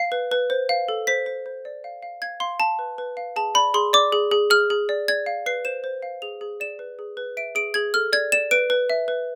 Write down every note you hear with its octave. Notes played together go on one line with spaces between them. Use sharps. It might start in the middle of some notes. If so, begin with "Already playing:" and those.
Already playing: F5 C7
B4
B4
C5
F5
A4
C5 B6
C5
C5
D5
F5
F5
F5 G#6
F5 C6
F5 A5
B4
B4
F5
G#4 A5
D5 B5
G#4 C6
D5 D6
G#4
G#4
G#4 F6
G#4
D5
D5 G#6
F5
B4 C7
C5 E7
C5
F5
G#4 F7
G#4
D5 E7
B4
G#4
B4
E5 D7
G#4 D7
G#4 G#6
A4 F6
D5 G#6
D5 E7
B4 D7
B4
E5
B4